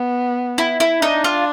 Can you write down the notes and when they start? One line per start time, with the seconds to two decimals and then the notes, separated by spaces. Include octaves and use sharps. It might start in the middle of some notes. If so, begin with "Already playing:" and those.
Already playing: B3
0.58 E4
0.80 E4
1.02 D4 D#4
1.24 F4